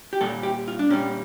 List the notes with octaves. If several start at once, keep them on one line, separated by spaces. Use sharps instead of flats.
G4
A#2 G3 A4
G4
F4
D4
A#2 G3 C#4